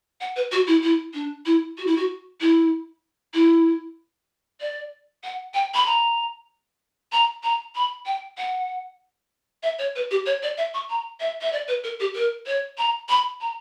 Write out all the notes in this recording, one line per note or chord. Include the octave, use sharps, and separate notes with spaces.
F#5
B4
F#4
E4
E4
D4
E4
F#4
E4
F#4
E4
E4
D5
F#5
G5
B5
A#5
A#5
A#5
B5
G5
F#5
E5
C#5
B4
G4
C#5
D5
E5
C#6
A#5
E5
E5
D5
B4
A#4
G4
A#4
C#5
A#5
B5
A#5